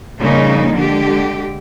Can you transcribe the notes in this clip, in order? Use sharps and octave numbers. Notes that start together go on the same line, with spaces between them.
F2 A#2 C#3 G3 A#3 D#4
D3 G#3 G4